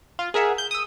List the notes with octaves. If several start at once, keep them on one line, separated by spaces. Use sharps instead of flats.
F4
G#4 A#4 E5 F#5
G6
D#6 E6